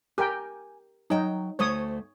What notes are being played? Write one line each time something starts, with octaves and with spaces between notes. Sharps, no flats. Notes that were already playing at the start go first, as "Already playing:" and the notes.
G4 A#4 G5 G#5
F#3 D#4 G5
D2 A3 C5 C#5 D#6